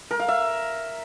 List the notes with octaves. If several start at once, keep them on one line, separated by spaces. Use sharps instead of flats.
A#4
F5
E5